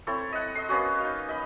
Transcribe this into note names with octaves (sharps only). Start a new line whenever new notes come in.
C4 E4 A4 C#5
D#5 F#5
D#5 C6
A#3 B3 C#4 F#4
D#4 F5
D#5 B5